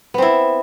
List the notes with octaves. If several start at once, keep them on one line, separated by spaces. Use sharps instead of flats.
B3 C4 E4